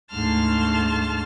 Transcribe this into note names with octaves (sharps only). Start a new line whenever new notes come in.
D2 G#2 A3 A5 C6 F6